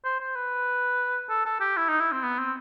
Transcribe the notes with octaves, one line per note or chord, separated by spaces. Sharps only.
C5
C5
B4
A4
A4
G4
E4
D#4
E4
C4
B3
C4